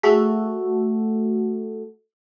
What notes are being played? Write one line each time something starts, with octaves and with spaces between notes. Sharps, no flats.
A3 F#4 G#4 A4 B6